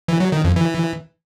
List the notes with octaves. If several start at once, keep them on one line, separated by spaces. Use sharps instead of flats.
E3
F#3
D#3
F2
E3